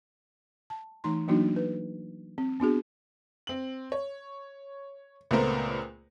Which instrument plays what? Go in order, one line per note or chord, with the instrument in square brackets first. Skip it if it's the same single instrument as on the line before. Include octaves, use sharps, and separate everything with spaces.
[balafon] A5
E3 A3 D#4 A#5 C6
E3 F#3 A#3 D4 D#4 F#4
B4
C4
B3 D4 F#4 G#4
[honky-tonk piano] C4 F#7
C#5
C#2 A#2 A3 B3 A#4 C5